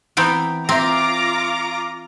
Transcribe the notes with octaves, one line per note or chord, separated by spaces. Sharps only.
E3 B3 C4 A#5 G6 D7
C4 F4 E5 A#5 D6 A#6